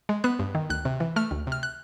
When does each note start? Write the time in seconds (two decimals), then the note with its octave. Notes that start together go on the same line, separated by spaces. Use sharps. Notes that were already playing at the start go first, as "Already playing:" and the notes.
0.09 G#3
0.24 B3 F#6
0.39 G2
0.55 D#3
0.70 D2 F#6
0.85 C3
1.00 E3
1.16 A3 F6
1.31 D2
1.47 C3 F6
1.63 F#6